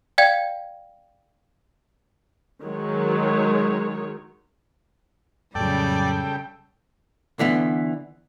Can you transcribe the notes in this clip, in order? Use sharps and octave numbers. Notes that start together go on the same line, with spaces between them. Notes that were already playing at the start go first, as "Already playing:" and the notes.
D5 F5 G5 G#6
D#3 F#3 G#3 C#5
F2 A2 C#3 F#3 G3 A4 D5 G5
D3 E3 B3